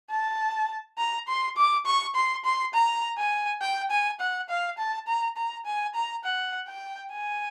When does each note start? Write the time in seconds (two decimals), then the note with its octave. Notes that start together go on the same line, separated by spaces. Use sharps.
0.11 A5
0.98 A#5
1.28 C6
1.57 D6
1.86 C#6
2.15 C6
2.45 C6
2.74 A#5
3.18 G#5
3.62 G5
3.90 G#5
4.20 F#5
4.49 F5
4.78 A5
5.07 A#5
5.37 A#5
5.66 G#5
5.95 A#5
6.25 F#5
6.68 G5
7.12 G#5